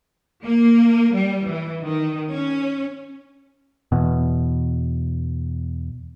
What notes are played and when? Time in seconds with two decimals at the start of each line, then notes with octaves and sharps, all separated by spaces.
0.44 A#3
1.15 G3
1.46 E3
1.83 D#3
2.33 C#4
3.92 E2 B2